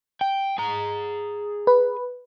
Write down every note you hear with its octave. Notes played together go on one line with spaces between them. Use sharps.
G5
G#4 A#5
B4